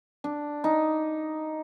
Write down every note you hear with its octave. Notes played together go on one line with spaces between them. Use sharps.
D4
D#4